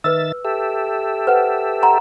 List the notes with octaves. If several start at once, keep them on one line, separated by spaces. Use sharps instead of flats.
D#3 B4 E5 E6 A6
G4 A4 E5
B4 C5 F#5
F#5 A#5 C6